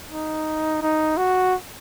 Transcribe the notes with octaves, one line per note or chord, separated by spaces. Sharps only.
D#4
D#4
F#4